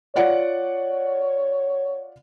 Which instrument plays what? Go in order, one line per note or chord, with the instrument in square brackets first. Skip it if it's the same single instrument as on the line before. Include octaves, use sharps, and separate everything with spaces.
[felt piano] F4 D5 F#5 [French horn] C#5